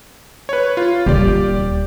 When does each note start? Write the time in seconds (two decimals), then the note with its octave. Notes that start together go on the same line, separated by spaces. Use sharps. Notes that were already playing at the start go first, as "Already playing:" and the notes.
0.49 B4 C#5
0.77 F4
1.06 D#1 G4 D5